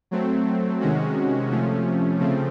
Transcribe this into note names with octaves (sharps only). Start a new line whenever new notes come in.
F#3 A3 C4
C3 D#3 G#3 C#4 F#4
C3 F3 A3 C#4
C#3 F3 A3 C4